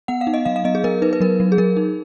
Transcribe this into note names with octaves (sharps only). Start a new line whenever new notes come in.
B3 F#5
F5
D#4
D#5
F#3 F5
F5
B3 D#5
G#4
B3 A#4
D#4 B4
B4
F#3 A#4
F#3
G#4
F#3 A#4
D#4